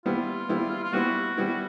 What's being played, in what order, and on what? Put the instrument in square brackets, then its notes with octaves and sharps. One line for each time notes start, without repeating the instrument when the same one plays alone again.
[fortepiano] G3 B3 E4 [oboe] F4
[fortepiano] G3 B3 E4
[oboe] F4
[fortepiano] G3 B3 E4 [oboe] F#4
[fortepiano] G3 B3 E4